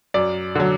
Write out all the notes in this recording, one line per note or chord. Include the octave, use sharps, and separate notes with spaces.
F#2 D5
D3 F#3